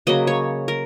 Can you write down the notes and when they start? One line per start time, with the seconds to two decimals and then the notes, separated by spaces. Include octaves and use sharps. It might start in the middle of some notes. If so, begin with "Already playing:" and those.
0.07 C#3 F#3 A#3 D#5
0.27 C#5
0.68 A#4